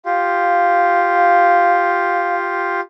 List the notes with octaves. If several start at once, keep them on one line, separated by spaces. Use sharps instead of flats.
F4 G4 F5